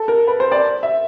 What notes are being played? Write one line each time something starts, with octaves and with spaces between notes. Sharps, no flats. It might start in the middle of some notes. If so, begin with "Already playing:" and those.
Already playing: A4
A#4
B4
C5
D5
E5